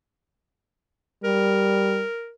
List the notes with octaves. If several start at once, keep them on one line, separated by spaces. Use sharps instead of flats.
G3 A#4